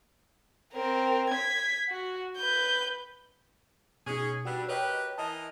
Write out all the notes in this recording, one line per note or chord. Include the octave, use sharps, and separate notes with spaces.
C4 A#4
G#6 B6
F#4
B4 G6
B2 C#4 D#4 G#4
G3 B3 D4 F#4 G5 E6
G4 A#4 B4 C#5 D#5 G5
E3 A#4 D#5 A5